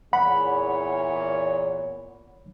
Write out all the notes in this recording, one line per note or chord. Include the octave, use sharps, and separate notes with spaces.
E2 A#2 C#5 F#5 B5